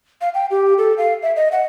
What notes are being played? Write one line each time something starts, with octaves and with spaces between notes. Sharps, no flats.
F5
G5
G4
A4
F5
E5
D#5
F#5